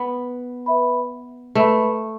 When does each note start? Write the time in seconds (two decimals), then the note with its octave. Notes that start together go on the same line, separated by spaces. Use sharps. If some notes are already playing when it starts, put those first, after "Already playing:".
Already playing: B3
0.66 B4 E5 B5
1.55 A3 B4 E5 B5